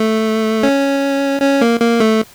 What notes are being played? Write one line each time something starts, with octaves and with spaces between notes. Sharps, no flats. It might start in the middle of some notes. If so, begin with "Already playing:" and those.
Already playing: A3
C#4
C#4
A#3
A#3
A3